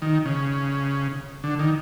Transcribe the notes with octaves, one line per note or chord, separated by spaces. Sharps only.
D#3
C#3
D3
D#3